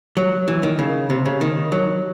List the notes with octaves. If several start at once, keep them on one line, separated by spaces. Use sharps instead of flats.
F#3
E3
D#3
C#3
C3
C#3
D#3
F#3